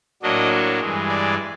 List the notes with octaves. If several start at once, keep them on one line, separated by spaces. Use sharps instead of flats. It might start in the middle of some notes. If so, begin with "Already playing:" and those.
A2 F#3 A#3 D4 D#5
G2 E3 G#3
D5